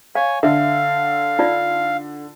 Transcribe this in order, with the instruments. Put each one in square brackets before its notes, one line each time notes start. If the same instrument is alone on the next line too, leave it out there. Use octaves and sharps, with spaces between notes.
[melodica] C#5 G#5 [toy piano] F5
[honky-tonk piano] D3 [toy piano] E5 [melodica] F5
[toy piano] D#4 F4 D5